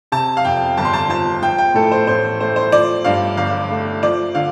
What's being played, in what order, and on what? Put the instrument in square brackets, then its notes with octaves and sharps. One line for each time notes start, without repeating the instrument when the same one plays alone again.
[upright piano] C3 A5
F5
F2 G5
G1 A5
C6
A5
F3 A5
F3 G5
G5
A2 A4
C5
A1 C5
A3 C5
C5
F3 D5
G2 F5
G1 F5
A3
F3 D5
D3 F5